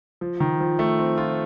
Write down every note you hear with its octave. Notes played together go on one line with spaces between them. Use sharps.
F3
D#3
F3
A3
C4
F4